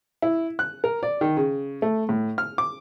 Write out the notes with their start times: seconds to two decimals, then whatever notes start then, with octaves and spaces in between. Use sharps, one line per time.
0.22 E4
0.59 F#6
0.84 A#4
1.03 D5
1.21 D#3
1.37 C#3
1.82 A3
2.09 A2
2.38 F6
2.58 D6